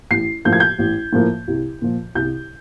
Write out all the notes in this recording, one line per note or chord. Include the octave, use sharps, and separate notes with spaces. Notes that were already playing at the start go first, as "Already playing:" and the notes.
A1 C7
A2 F3 A#3 G6
G#6
G6
A1
A2 F3 A#3
C2
A#2 F3
C2 G6